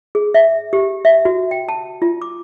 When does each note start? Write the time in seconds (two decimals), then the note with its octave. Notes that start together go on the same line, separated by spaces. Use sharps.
0.15 G#4
0.34 E5
0.73 G4
1.05 E5
1.25 F#4
1.51 G5
1.69 A5
2.02 F4
2.22 D6